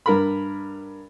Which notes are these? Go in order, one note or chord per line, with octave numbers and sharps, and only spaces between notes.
G2 A#4 B5